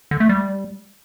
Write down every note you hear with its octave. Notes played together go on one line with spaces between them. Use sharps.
D3
A3
G3